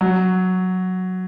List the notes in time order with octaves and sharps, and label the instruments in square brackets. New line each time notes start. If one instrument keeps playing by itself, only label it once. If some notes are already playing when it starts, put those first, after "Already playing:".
[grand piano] F#3